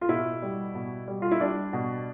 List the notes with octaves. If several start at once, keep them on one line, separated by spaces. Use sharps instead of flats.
F4
B2 E4
G3
B2
G3
F4
E4
G3 D4
B2